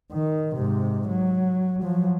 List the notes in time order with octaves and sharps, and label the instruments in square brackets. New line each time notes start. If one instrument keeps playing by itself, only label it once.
[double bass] D#3
G#2 C3
F#3
F3 F#3